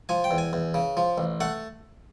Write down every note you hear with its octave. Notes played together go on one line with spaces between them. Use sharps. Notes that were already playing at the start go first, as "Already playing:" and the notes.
F3 G#5
G5
E2
G#5
E2
C#3
F3
A1
A3 F#5